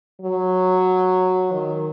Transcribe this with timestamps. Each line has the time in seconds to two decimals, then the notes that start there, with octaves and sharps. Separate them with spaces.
0.21 F#3
1.53 D#3